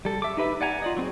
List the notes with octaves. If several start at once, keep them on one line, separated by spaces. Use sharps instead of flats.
G3 A4
E5 D6
D#4 G4 B4 E5
D5 F#5 G#5 A#5
F4 D5 D#5
F#3 C4 G#4